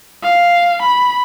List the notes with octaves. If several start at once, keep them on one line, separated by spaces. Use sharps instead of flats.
F5
B5